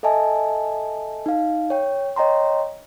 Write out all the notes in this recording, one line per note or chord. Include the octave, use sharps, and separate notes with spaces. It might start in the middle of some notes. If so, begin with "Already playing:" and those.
A4 D#5 E5 G#5 A5
D#4 F5
C#5 G5
C#5 D#5 G5 A#5 C6